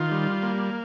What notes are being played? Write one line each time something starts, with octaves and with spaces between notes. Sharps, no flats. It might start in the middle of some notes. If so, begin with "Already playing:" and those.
Already playing: D#3 F4
G3
A#3